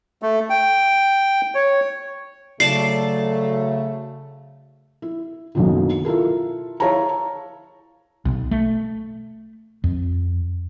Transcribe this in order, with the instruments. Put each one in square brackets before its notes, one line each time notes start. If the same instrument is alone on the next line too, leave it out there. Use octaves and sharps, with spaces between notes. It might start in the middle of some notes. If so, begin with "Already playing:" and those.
[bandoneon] A3
G5
C#5
[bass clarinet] C#3 [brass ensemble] F#3 A3 [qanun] D5 A5 [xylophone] C7
[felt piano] E4
F#1 B1 F#2 B2 D3 D#3
E4 F4 A4 A#4
E4 C#5 F5 A5 A#5
[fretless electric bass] B1
A3
F2